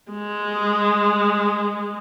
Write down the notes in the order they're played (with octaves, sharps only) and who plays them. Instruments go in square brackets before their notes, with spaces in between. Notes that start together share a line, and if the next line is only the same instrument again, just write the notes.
[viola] G#3